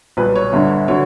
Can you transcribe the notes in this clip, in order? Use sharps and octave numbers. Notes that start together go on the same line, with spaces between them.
B1 A#2 G3 B4
C#5
G1 G2 D3
D3 F#3 C#5